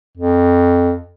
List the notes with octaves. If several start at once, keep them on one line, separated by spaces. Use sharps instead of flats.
F2